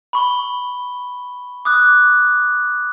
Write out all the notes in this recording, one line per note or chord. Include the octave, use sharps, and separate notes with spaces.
B5 C#6 G7
D6 D#6 F#6